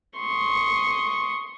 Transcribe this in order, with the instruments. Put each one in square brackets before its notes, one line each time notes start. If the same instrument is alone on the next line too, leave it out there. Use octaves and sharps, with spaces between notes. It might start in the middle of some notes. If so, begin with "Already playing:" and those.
[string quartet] C6 C#6 D#6